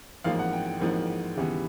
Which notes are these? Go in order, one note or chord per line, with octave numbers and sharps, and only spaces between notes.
A1 G#2 F3 A#3 F5
F#5
G5
G5
A1 G#2 F3 A#3
D#2 C#3 E3 G3 B3